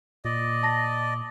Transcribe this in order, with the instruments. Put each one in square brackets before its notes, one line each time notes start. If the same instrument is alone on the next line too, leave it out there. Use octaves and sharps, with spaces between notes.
[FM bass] A#2 [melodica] D5 D#5
[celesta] A5 A#6